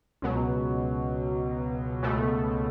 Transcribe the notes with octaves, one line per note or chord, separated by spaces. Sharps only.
C#2 B2 F#3
C#2 B2 A3